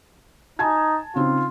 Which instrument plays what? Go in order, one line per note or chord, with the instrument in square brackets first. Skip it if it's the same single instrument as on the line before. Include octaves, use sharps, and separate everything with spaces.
[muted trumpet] D#4 [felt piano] G#5 A5 G#6
[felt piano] C#3 C4 D#4 [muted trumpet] F4